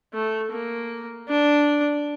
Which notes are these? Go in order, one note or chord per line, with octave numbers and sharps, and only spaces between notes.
A3
A#3
D4